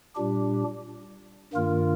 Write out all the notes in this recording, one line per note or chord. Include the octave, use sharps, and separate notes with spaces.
A#2 G3 D4 G4
G2 D#3 A#3 F4 A#4